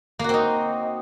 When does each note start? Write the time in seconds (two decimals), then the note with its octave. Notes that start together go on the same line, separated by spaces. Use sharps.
0.19 A#3
0.24 F#4
0.29 C4
0.34 D#4